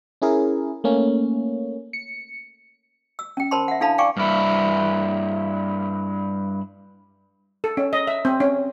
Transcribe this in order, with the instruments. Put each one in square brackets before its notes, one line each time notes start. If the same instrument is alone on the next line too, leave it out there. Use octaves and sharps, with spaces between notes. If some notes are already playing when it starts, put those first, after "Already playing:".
[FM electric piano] C#4 E4 G#4 A#4
A3 A#3 C#4
C#7
[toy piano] E6
C#4 G5
A#4 C5 A5 B5 C6
E5 F#5
D4 E4 A4 F5 A5 B5
D5 F5 G5 G#5 C#6 D6
[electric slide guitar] G2 E4
[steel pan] A4
C#4
D#5
E5
C4
C#4